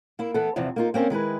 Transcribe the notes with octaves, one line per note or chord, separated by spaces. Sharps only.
A#3 E4
E3 B3 A4
E2 C3 E3 F3
A#3 D#4 F4
A#3 C4 C#4 C5
D#3 G#3 E4 B4